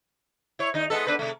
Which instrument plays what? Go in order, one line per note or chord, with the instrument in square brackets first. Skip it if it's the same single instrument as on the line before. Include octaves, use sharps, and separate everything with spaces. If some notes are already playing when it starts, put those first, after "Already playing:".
[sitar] E4 C#5
D#2 D#4
G#3 B3 A4
B3 D4 B4
C3 A3